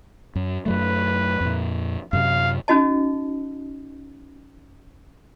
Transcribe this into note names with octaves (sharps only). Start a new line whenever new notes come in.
F#2
F#2 F#3 A3 B4
F2 A#2
F#2 C3 F5
C#4 D#4 F#4 D#5 A5